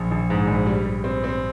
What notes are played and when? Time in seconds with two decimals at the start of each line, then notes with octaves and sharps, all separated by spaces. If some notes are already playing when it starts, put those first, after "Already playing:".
Already playing: A#1
0.11 A#1
0.30 G#2
0.48 A#1
0.66 G3
0.86 G3
1.04 C4
1.24 C4